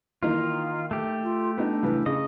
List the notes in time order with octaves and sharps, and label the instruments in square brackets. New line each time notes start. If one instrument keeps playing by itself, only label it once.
[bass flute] D#3 [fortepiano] E3 A#3 D#4 [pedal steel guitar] F4
[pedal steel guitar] A3 G4
[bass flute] F4
[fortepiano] B3 D#4 [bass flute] D4
[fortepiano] C#2 E3 B4
[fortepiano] C#3 [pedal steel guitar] D#5